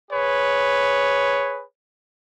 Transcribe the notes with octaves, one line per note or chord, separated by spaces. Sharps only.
G#4 B4 C#5